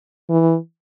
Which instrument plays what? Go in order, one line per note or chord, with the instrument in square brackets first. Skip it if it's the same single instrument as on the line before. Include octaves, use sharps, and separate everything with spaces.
[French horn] E3